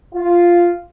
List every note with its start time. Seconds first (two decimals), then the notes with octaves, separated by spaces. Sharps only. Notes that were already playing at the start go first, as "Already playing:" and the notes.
0.13 F4